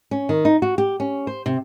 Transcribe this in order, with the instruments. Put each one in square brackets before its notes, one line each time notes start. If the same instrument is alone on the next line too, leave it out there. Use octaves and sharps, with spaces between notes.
[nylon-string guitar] C#4
D#3
D#4
F#4
G4
C#4
C5
C3